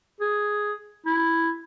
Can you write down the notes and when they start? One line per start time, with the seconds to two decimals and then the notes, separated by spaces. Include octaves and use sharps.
0.21 G#4
1.06 E4